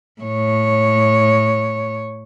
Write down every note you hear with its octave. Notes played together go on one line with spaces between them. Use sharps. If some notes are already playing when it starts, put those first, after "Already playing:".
A2 C#5